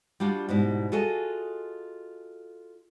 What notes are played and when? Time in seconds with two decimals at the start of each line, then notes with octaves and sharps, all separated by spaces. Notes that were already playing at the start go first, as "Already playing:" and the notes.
0.20 G3 D4 F4 F#4
0.49 G#2 B2 G3 E4
0.92 F4 F#4 G#4 A4 D#5